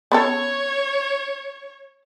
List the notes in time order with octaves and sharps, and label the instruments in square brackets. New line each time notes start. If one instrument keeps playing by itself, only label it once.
[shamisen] B3 C#4 A4 [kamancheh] C#5